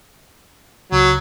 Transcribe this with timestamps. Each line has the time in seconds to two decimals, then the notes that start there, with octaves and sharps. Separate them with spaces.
0.92 C#2 F#3